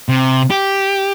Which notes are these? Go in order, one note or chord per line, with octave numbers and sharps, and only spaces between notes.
C3
G4